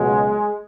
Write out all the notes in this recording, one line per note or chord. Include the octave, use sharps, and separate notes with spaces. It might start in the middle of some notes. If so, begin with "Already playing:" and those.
Already playing: C#2 B2 F#3 G#3